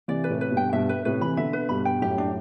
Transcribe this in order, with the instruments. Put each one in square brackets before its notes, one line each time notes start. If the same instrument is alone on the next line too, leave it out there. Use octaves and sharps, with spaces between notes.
[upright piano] C3 E3 [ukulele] D5
[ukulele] B4
[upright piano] A2 C3
[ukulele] B4
[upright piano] G2 B2
[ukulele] G5
[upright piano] G2 B2 [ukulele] E5
[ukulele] B4
[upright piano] A2 C3 [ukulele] B4
[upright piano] C3 E3 [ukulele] B5
[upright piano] B2 D3 [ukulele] E5
[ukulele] B4
[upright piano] G2 B2 [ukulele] B5
[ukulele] G5
[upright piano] F#2 A2 [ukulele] G4
[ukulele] D4